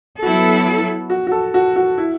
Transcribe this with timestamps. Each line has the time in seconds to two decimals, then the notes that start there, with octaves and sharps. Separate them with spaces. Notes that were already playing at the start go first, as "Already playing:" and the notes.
0.22 F#3 B3 E4 F#4 A4
1.10 F#4
1.27 F#4
1.32 A4
1.54 F#4
1.76 F#4
1.98 E4